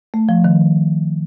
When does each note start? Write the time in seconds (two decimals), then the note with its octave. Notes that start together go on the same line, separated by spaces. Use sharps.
0.14 A3
0.29 F3
0.44 D#3